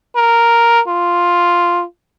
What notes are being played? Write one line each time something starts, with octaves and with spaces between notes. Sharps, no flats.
A#4
F4